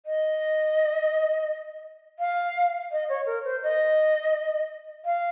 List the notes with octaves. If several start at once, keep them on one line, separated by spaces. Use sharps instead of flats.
D#5
F5
D#5
C#5
A#4
C5
D#5
F5